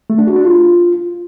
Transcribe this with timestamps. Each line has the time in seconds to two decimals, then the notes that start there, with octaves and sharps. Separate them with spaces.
0.10 A3
0.18 D4
0.27 F#4
0.36 D4
0.45 F4